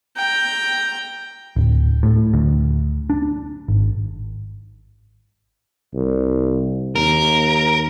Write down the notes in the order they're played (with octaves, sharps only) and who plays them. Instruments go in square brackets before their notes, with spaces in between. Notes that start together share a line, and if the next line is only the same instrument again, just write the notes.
[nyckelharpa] G5 A#5
[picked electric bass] D1
A2
D2
D4
G#1
[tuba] C2
[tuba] D#2 [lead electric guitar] A#4